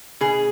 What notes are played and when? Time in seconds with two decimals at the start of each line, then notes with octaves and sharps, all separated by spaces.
0.21 B2 G#4